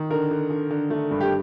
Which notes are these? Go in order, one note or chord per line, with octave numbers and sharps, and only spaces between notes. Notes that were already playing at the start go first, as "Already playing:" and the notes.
Already playing: D#3
D3 A#4
D3
D3
D3
A3
G2
G4